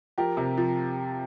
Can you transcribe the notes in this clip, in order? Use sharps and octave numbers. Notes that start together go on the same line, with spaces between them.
F3 G4 A#4
C3
F3